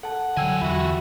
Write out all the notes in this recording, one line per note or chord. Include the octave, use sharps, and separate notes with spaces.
A4 F#5 A5
D3 F#3 G3 G5 G#5 E6 G#6
E2 F4 F#4 E5 B5